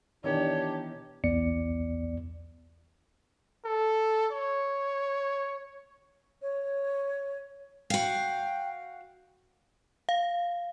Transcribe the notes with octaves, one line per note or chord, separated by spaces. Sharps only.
B2 D#3 E3 D4 G4 C#5
B1 E2 B3 D5 C#7
A4
C#5
C#5
F#4 F5 G5
F5